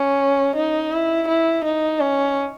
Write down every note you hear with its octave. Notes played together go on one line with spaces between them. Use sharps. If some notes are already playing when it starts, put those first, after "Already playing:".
Already playing: C#4
D#4
E4
E4
D#4
C#4